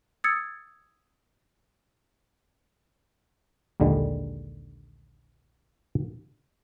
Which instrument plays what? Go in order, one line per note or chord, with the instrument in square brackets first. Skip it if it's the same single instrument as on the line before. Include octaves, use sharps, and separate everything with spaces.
[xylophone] D#6 E6 G#6 A6 C#7
[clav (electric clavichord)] A#1 D#2 D3 G3 G#3